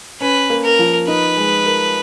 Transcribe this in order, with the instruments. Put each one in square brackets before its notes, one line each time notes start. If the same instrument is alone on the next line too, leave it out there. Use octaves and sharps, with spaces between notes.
[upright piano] C#4 [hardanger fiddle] B4
[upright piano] A#3
[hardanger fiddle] A#4
[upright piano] F3
[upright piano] D#4 [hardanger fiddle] B4
[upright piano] G#3
A#4